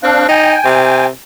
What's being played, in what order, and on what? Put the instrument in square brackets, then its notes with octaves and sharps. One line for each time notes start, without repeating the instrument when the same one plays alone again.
[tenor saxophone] C4 [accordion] D4 F5 F#6
[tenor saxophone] D#4 [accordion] G5 G#5
[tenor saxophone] C3